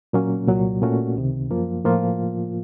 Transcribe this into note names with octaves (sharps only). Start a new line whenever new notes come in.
A#2 F#3 A#3 C#4
C2 A#2 F#3
A#2 A3 C#4 F#4
C#2 C3 D#3
F#2 F3 A#3 F4
A2 F3 A#3 F4